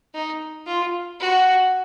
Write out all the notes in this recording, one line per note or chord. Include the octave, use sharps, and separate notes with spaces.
D#4
F4
F#4